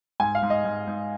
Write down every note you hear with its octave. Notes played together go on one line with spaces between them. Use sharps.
G#2 G#5
F5
G#2
D#5
G#2
G#2